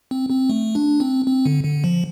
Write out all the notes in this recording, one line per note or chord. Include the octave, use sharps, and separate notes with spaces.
C4
C4
A3
D4
C4
C4
D3
D3
F3